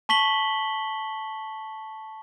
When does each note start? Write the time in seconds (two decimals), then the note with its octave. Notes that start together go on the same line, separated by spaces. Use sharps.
0.09 A5 C#6 B6 F#7 G7